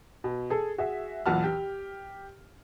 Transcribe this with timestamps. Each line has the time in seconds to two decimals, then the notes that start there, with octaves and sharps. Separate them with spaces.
0.24 B2
0.50 G#4 A4
0.78 F#4 G#4 E5
1.26 B1 E2 A#2 F#4 A5 F6
1.44 G4